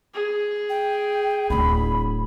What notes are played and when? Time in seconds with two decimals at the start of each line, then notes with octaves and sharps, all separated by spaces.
0.14 G#4
0.70 G5
1.50 D1 D4 B5